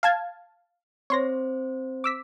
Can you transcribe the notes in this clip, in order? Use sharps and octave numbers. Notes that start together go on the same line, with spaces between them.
F5 A5 G#6
C4 C5 C#5 C6 A#6
D6 E6 B6